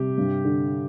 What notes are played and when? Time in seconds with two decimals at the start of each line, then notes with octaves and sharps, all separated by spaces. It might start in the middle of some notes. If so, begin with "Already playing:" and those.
Already playing: C3 G3 G4
0.18 G2
0.45 D3